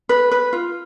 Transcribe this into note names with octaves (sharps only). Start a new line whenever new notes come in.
B4
B4
F4